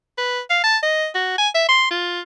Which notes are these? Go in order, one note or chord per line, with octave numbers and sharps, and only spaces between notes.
B4
F5
A5
D#5
F#4
G#5
E5
C6
F4